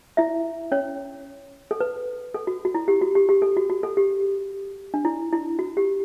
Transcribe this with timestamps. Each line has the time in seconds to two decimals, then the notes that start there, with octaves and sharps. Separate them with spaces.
0.17 E4 E5
0.72 C#4 C#5
1.71 A4
1.80 B4
2.34 A4
2.47 F#4
2.65 F#4
2.75 E4
2.88 G4
3.02 F#4
3.15 G4
3.29 G4
3.42 A4
3.57 F#4
3.70 F#4
3.83 A4
3.97 G4
4.94 D4
5.05 E4
5.33 E4
5.59 F#4
5.77 G4